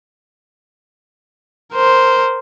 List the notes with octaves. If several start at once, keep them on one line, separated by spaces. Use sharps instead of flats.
A#4 C5